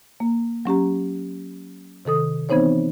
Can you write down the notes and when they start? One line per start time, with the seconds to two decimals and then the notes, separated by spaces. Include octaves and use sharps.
0.20 A#3
0.65 F#3 C#4 G4 A#5
2.05 C3 D#3 A4 D#6
2.49 E3 B3 C4 D#4 C5 C#5